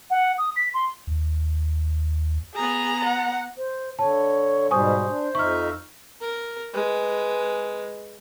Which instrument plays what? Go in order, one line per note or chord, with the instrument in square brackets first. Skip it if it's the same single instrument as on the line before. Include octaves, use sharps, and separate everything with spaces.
[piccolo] F#5
D#6
B6
C6
[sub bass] D#2
[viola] B3 A#5 [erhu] G#4
[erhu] F#5
[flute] C5
[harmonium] D3 [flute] C#5 [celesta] A5
[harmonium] G#2 B2 G3 [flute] C5 [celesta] G#5 C#6 D#6
[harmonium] D4
[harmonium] F2 D#4 E5 [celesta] C#6 F6
[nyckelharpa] A#4
G#3 B4